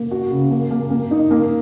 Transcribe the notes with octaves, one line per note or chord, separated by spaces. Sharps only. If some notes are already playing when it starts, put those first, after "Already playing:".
Already playing: A#3
F#4
C#3
A#3
A#3
A#3
D#4
A#3